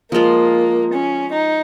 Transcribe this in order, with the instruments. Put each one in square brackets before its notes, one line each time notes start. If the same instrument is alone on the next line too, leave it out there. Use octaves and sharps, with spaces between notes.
[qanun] F3 G#3 F4 [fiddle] A#3
[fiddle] C#4
D#4